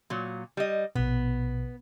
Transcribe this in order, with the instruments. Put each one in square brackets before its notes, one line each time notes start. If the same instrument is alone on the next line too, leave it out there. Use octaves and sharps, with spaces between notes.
[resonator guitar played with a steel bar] A#2 F#3
G3 D#5
[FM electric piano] A#1 B2 [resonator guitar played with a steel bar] B3